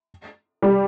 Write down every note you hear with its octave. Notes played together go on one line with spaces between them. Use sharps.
G3